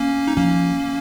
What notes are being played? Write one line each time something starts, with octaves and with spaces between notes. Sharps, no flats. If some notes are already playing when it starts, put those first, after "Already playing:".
Already playing: A#3 C#4
D#4
F3 A#3 C#4